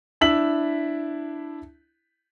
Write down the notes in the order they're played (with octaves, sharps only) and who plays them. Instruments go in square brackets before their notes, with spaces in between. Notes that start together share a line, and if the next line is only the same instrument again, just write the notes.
[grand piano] D4 E4 E6 B6 F#7